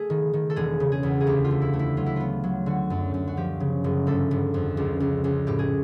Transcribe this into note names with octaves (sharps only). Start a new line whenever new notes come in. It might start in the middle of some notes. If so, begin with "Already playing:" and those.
Already playing: A3 G#4
D#3
D#3
A4
E1 G#4
C#3
G#4
E2
G#4
D2 G4
F4
A3
E4
A3
E4
F#3 F4
E4
B3 F4
F#3
D3 F#4
F#2
F#2
F#4
F3 G4
C#3
F#1
G1 A4
G1
F2
C#2
C#2
C#2
A2 G4
G#4